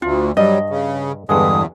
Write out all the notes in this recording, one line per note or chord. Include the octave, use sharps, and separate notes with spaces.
D2 F4
G2 F#3 G3 D#5
C#3
E2 G2 D3 G#3 D#6